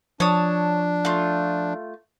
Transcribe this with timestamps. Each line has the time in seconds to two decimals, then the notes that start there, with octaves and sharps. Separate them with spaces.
0.20 F3 D4 C#5 A5 D#6
1.05 A3 F4